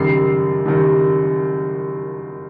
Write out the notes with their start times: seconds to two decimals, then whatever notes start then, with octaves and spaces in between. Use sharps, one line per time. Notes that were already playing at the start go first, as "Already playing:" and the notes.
Already playing: F#1 F#2 D#3 G3 C7
0.66 F#1 F#2 D#3 G3